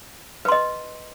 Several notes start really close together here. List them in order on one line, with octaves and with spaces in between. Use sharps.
B4 C6 D#5